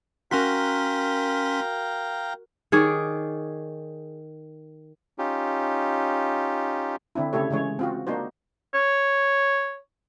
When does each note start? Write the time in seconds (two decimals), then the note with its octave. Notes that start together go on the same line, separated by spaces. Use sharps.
0.31 C#4 F#4 A#4 F5 G5 A#5 C6 B6
2.72 D#3 G#4 C#5 D5
5.18 C#4 D#4 F4 G4
7.15 D3 C4 D4 E4
7.33 C#3 A3 E4 G4 A4 C#5
7.50 C#3 E3 G#3 C#5
7.79 C4 F4 F#4
8.07 A#3 D4 D#4 F#4 C5
8.74 C#5